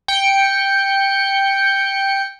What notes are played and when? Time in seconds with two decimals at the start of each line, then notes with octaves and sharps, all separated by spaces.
0.08 G5 C#7